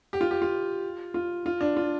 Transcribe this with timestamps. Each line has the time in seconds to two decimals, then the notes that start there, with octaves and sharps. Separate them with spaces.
0.13 G4
0.21 F4
0.31 G4
0.42 F4
1.14 F4
1.46 F4
1.61 D4
1.77 F4